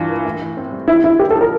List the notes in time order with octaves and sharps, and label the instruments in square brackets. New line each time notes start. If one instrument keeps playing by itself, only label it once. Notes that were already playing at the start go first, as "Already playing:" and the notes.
Already playing: [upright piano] G2 E3 F4
A#3
A2
E3
C4
G3
[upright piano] E2 [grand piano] E4
[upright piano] D3 [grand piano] E4
[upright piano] A#3 [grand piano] G4
[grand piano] A4
[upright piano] F3
[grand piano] A#4